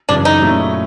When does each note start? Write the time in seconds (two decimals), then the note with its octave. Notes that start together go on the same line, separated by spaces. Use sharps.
0.09 F#2 C#3 E3 D4
0.25 D#4
0.41 A#2 F#3 A3 C#4 E4